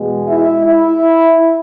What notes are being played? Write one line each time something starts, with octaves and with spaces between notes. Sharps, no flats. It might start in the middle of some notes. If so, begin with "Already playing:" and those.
Already playing: E2 B2 G#3
E4 E5
E4 E5